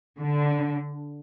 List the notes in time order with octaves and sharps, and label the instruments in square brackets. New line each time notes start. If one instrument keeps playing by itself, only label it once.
[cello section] D3